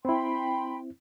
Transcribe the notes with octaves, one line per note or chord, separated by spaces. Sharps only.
C4 E4 G5 B5 C6